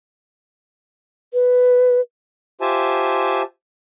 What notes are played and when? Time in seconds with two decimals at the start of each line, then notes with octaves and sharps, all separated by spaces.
1.33 B4
2.61 F4 G4 C5 E5 G#5 A5